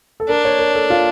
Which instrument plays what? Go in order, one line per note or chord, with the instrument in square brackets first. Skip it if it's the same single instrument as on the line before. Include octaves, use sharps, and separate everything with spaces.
[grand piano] A4
[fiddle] D4 [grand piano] A#4
[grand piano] C#5
A#4
A4
F4